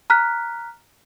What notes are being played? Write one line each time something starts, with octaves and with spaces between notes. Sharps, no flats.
A#5 F6 F#6 B6